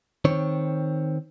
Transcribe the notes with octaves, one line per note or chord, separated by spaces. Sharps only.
D#3 C4 C#5